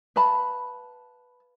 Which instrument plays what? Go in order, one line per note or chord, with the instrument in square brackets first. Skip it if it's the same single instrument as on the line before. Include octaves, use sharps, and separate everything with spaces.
[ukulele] B4 F5 A5 B5